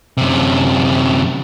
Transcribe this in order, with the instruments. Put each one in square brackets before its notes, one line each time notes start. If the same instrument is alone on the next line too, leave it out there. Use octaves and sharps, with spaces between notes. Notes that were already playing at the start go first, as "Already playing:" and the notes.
[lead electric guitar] F#2 C3